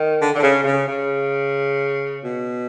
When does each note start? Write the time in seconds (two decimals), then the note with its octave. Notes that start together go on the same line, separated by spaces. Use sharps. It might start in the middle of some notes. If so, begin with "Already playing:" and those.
Already playing: D#3
0.19 D3
0.35 D3
0.42 C#3
0.64 C#3
0.86 C#3
2.23 B2